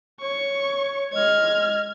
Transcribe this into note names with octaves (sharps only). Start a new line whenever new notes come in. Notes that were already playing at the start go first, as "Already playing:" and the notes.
C#5 C#6
G#3 D#5 F6 G#6